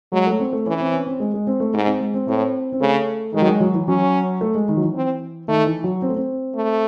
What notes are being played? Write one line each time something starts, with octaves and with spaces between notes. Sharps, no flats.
F#3 G#3
A3
C4
A3
E3 C#4
C4
C#4
C4
G#3
G#3
C4
A3
G#2
C4
G#3
C4
A2 C4
C4
C#3 A3
D#3 G#3
F#3
G#3
F#3
E3
F#3 C#4
A3
G#3
D#3
F#3
E3
C4
D#3 A3
E3
F#3
C4
A3
C4
A3